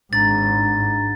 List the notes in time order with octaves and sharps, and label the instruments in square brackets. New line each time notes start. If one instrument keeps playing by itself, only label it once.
[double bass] G#1 G#2 [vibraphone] D4 A#5 [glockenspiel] A6